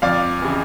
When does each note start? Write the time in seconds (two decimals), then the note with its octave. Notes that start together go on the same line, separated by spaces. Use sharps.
0.02 F2 D5 F5
0.42 C#3 E3